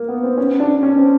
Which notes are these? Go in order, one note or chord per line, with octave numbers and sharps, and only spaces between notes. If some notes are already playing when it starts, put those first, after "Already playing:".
Already playing: A#3
B3
C4
C#4
D4
C#4
C4